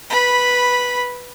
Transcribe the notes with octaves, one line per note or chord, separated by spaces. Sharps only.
B4 B5